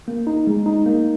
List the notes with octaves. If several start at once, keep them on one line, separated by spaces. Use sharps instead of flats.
A#3
D#4
G#3
D#4
A#3